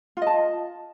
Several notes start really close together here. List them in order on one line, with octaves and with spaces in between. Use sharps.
F4 D#5 A5